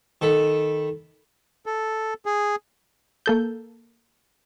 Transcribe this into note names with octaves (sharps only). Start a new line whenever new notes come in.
D#3 A4 B5
A4
G#4
A#3 A4 G6